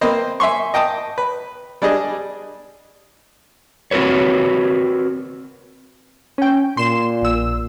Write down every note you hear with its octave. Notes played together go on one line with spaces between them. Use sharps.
A#3 C4 B4 C5 D#5
E5 G#5 C6 C#6
D#5 G5 A5 D#6
B4
G3 D4 G#4 D#5
C4 F#4 A#4 B4 C#5
C#4 G5
A#2 C6 C7 E7
A#1 E6